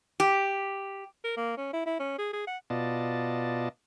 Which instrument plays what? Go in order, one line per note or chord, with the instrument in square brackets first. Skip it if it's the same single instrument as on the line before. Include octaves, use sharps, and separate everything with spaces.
[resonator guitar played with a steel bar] G4
[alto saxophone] A#4
A#3
C#4
E4
E4
C#4
G#4
G#4
F#5
[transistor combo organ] B2 B3 F4 D5 D#5 A5